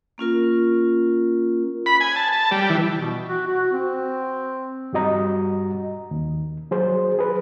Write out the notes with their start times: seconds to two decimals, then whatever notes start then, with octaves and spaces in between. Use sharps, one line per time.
0.18 A#3 C#4 F4 A#4
1.86 B5
2.01 G#5
2.16 A5
2.33 A5
2.51 G3
2.70 E3
2.96 B2
3.26 F#4
3.47 F#4
3.72 C4
4.93 G2 G3 F#4 D#5 A#5
6.11 D#2
6.71 F#3 G#4 C5
7.19 G#4 B4